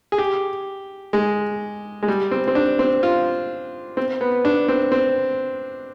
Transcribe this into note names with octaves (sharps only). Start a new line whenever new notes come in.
G#4
G4
G#3
G#3
G3
C4
C4
D4
C4
F4
C4
B3
D4
C4
C4